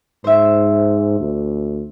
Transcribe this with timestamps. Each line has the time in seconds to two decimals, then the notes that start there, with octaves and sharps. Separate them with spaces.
0.24 G#2 C5 E5
1.20 D2